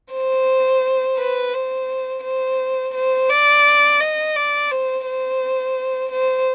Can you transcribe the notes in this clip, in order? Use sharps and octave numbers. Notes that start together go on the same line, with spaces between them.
C5
B4
C5
C5
C5
D5
D#5
D5
C5
C5
C5